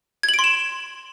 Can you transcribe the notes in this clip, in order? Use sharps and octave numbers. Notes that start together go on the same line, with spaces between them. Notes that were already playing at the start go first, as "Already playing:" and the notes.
G#6
F#7
D7
C6
E7